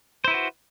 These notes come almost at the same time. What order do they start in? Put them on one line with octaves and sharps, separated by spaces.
C5 E4 B4 F#4